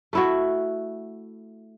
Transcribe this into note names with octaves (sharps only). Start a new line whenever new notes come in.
A3 E4 F#4